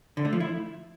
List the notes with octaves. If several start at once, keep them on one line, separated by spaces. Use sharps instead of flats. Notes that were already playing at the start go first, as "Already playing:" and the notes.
D3
A3
F3
E4